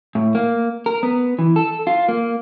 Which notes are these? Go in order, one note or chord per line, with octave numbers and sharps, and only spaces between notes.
A2
A#3
A#4
B3
E3
A4
F4
A#3